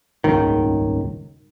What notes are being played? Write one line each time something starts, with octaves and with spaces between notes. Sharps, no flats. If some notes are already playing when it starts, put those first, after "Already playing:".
D#1 G#1 C#2 D#3